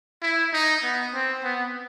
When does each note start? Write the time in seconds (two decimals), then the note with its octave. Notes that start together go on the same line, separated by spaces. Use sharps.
0.22 E4
0.53 D#4
0.83 B3
1.14 C4
1.43 B3